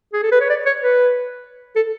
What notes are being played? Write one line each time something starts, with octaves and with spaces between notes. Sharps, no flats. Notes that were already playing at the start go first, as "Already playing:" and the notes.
G#4
A4
B4
C#5
D5
C#5
B4
A4